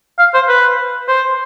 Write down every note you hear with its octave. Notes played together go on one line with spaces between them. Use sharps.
F5
C5
B4
C5